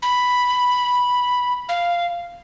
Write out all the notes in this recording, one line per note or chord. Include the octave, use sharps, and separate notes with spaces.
B5
F5